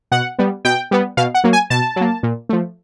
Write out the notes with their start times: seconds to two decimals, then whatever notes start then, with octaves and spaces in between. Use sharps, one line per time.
0.12 B2 F#5
0.39 G3 B3
0.65 B2 G5
0.91 G3 B3
1.17 B2 F5
1.34 F#5
1.44 F#3 A#3
1.53 G#5
1.70 B2 A5
1.96 F#3 A#3
2.23 A#2
2.49 F3 A3